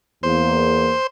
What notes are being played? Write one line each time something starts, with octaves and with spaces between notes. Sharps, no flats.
E2 A#3 C5